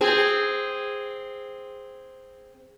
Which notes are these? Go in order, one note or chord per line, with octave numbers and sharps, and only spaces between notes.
C4 G#4